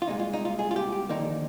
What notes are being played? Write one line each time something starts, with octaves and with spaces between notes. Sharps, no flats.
F4
C2 A#2 G#3 D#4
F4
D#4
F4
G#4
F4
G4
G4
D#2 D3 F3 A#3 D#4